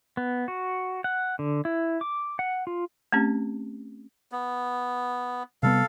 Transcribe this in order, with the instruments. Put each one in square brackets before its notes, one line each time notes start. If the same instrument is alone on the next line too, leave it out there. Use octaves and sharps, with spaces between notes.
[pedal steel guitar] B3
F#4
F#5
D3
E4
D6
F#5
F4
[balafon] A3 C4 C#4 G4
[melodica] B3
[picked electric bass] C3 G3 B3 [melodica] A4 F5